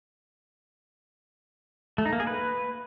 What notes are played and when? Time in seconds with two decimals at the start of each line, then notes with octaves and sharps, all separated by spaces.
1.98 A3
2.05 D#4
2.13 A#3
2.20 G#4
2.27 B4